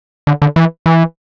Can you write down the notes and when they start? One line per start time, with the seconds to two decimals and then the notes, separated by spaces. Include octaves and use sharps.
0.27 D3
0.42 D3
0.56 E3
0.86 E3